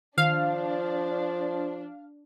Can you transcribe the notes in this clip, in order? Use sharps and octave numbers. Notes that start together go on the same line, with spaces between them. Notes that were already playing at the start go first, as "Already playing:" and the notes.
D#3 F3 D4 F5